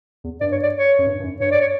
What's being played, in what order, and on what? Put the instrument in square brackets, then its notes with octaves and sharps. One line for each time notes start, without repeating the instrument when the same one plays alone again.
[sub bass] E2
[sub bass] G2 [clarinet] D5
[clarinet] C#5
D5
C#5
[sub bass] F#2
G2
G2
F#2
[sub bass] G2 [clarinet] C#5
[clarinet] D5
C#5